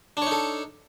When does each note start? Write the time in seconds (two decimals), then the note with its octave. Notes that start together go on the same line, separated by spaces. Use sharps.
0.17 D4
0.22 C#5
0.27 D#4
0.32 A4